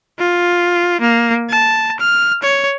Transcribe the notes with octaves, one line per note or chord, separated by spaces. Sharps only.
F4
A#3
A5
F6
C#5